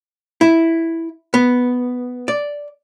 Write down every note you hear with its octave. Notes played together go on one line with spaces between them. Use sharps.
E4
B3
D5